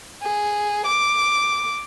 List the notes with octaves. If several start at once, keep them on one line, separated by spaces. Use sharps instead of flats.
G#4
D6